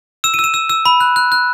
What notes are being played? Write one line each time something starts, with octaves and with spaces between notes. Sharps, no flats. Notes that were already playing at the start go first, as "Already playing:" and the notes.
E6 E7
D#7
E6
E7
E6
E6
B5
F#6
F#6
F#6